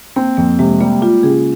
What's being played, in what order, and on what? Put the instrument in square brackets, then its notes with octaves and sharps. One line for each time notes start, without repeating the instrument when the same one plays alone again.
[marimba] A#3 [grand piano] C4
[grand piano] F2 [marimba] A#3
[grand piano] C3 [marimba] G#3
[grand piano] G3 [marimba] A#3
[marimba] F4 [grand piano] G4
[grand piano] C#3 [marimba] G#4